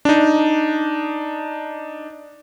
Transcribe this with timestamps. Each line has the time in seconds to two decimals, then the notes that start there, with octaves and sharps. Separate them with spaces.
0.05 D4 D#4